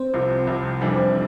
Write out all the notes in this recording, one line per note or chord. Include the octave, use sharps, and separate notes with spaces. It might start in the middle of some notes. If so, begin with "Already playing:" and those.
Already playing: C4 C5
C2 C3 F3
C2 C3 F3
F1 F2 E3 G3 D4